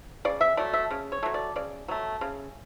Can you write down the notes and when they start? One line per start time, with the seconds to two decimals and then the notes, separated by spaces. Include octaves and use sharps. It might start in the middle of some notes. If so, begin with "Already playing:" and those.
0.25 C#3 D5
0.41 E5
0.57 F#3 A3 D5
0.73 E5
0.91 C#3
1.12 C#5
1.23 F#3 A3
1.34 D5
1.56 C#3 D5
1.88 F#3 A3
2.21 C#3